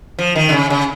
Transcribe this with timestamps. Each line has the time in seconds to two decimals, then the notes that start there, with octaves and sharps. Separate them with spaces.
0.19 F3
0.36 D#3
0.49 D3
0.52 C#3
0.70 C#3